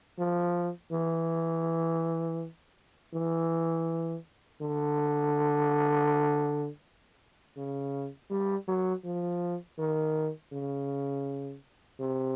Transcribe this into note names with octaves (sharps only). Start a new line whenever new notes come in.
F3
E3
E3
D3
C#3
G3
F#3
F3
D#3
C#3
C3